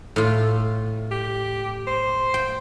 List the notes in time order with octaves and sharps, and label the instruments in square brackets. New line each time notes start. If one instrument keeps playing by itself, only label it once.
[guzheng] A2 F4
[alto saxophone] G4
C5
[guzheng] G5